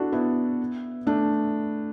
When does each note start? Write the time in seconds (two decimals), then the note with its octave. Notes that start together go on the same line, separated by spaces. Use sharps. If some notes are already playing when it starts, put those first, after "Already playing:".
Already playing: D4 E4 F#4 A4
0.12 B3 E4
1.07 A3 D4